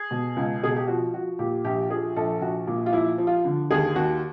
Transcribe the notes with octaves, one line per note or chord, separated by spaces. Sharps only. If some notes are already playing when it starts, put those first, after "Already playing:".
Already playing: G#4
B2
C#2
B2 G#4
G4
F3 F#4
F3 F#4
A#2 G4
A#1 G4
F3 G#4
A#1 A4
A#1 F#4
A#2
F4
F3 E4
F3
F4
D3
D#2 G#4
D#2 F#4